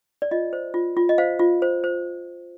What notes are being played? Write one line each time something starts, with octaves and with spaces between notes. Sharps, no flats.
D5
F4 D#5
C5
F4
F4
D#5
C5 F5
F4
C5
C5